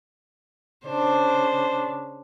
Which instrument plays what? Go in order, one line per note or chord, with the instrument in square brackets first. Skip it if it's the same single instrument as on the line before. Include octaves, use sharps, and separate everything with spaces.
[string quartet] C#3 D4 [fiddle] C5